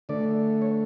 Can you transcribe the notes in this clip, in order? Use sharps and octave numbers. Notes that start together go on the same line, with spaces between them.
D3 A3 D5
C#5